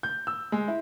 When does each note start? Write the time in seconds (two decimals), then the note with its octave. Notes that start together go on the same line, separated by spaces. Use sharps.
0.03 G6
0.27 E6
0.52 G#3
0.68 E4